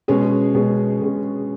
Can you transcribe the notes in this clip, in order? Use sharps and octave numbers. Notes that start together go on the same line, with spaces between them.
B2 G#3 C#4 G#4
B2 G#3 C#4 G#4
B2 G#3 C#4 G#4